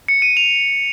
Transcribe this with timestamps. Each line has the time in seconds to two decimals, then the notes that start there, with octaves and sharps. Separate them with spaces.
0.08 C#7
0.22 D#7
0.37 F7